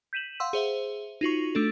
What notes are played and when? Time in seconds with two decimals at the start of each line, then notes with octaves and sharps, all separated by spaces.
0.13 G6 B6 D#7 E7 F#7
0.40 F5 F#5 C6 E6
0.53 G#4 C5 E5
1.21 D#4 F4 F#4 C#6
1.55 A3 D4 A4